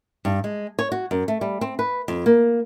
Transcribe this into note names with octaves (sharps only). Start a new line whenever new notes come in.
G2
G#3
C#5
F#4
F#2
A3
G3
C4
B4
F2
A#3